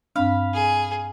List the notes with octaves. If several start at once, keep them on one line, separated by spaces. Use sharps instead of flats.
G2 C4 D4 F5 B5
G#4